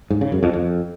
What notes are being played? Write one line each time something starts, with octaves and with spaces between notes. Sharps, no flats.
G#2
C#3
F#2
F2
F2